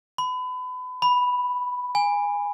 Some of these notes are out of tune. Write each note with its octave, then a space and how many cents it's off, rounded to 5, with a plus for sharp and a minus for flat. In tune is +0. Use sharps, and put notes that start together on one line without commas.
B5 +30
B5 +0
G#5 -20